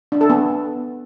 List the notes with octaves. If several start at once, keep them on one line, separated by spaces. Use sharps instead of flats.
D4
A4
B3